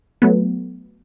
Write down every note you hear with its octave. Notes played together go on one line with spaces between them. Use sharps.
F#3 A3 B3